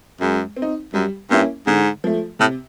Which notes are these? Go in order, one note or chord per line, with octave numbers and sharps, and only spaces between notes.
F#2 G#3
C4
D#4
F#2 G3
G2 A#3 C#4 E4
G#2 D3
F3 A3
A2 C3